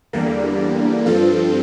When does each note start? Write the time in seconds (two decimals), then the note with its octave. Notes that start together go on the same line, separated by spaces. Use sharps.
0.13 E2 D3 G3 A#3
1.06 G2 F3 C4 F4 A4